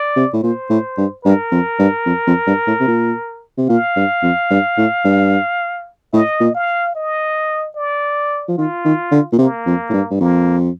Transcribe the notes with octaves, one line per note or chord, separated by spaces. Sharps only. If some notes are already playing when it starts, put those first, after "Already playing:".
Already playing: D5
C3
A2
A#2 C5
A2
G2
G2 A#4
F2
G2
F2
F2
G2
A2
C3
A#2
C3
A#2 F5
G2
F2
G2
A2
G2
A2 D#5
A#2
F5
D#5
D5
F3
D#3 F4
D#3
D3
A#2
C3 A#3
F2
A2
G2
G2
F2 A#3